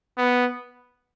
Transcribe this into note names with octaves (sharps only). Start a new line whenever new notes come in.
B3